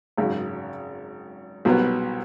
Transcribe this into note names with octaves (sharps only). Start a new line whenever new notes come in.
G#1 F#2 C#3
C2 B2 F#3 B3